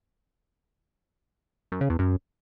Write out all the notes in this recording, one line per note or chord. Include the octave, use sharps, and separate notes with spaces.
F#2
C#3
E2
F#2